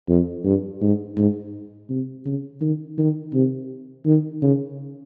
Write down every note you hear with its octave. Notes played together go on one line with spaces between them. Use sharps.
F2
G2
G#2
G#2
C3
C#3
D#3
D#3
C3
D#3
C#3